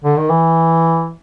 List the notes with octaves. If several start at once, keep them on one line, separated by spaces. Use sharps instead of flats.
D3
D#3
E3